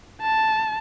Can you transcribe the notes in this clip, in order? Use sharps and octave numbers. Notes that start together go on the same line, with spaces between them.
A5